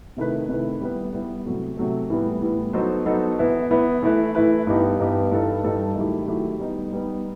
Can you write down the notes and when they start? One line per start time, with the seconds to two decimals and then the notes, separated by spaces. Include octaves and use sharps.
0.17 C3 D#3 A3 E4 B4
0.48 C3 D#3 A3 E4 B4
0.81 G3 B3 E4 B4
1.13 G3 B3 E4 B4
1.45 C3 F#3 A3
1.77 C3 F#3 A3
2.10 A2 E3 G3 B3
2.41 A2 E3 G3 B3
2.73 F#3 B3 D#4 A4 C5
3.06 F#3 B3 D#4 A4 C5
3.38 E3 B3 E4 B4
3.71 E3 B3 E4 B4
4.03 E3 A3 E4 B4
4.35 E3 A3 E4 B4
4.67 G2 E3 B3 D#4 G4
4.99 G2 E3 B3 D#4 G4
5.31 G2 E3 G3 D#4 A4
5.64 G2 E3 G3 D#4 A4
5.96 D#3 F#3 A3 E4 G4
6.27 D#3 F#3 A3 E4 G4
6.59 G3 B3 D#4
6.93 G3 B3 D#4